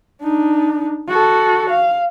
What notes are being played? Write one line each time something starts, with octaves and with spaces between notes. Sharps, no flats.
D4 D#4
F#4 A4
F5